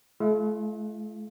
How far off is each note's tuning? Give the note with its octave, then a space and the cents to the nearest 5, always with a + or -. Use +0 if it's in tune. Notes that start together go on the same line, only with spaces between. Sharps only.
A3 -45 F4 -45 F5 +0